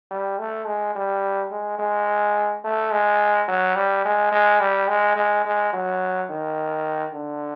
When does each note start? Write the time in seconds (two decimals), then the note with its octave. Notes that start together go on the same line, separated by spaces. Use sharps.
0.11 G3
0.39 A3
0.66 G#3
0.95 G3
1.51 G#3
1.79 G#3
2.64 A3
2.92 G#3
3.48 F#3
3.76 G3
4.05 G#3
4.32 G#3
4.60 G3
4.89 G#3
5.16 G#3
5.45 G#3
5.73 F#3
6.30 D#3
7.13 D3